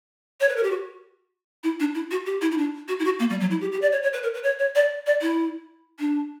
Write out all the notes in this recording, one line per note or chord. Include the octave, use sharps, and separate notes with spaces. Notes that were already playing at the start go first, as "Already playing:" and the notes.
C#5
B4
A#4
G4
F#4
E4
D4
E4
F#4
G4
E4
E4
D4
F#4
E4
F#4
A#3
G3
F#3
E4
G4
G4
D5
C#5
C#5
B4
A#4
B4
C#5
C#5
D5
D5
E4
D4